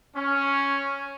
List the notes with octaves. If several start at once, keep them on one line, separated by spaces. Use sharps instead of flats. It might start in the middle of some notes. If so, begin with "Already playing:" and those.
C#4